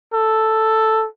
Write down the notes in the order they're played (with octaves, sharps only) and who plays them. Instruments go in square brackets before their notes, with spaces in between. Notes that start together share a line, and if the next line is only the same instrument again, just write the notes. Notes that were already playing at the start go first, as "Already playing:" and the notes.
[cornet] A4